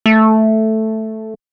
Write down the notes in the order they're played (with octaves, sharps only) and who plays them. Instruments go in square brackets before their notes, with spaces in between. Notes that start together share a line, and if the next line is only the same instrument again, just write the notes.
[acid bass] A3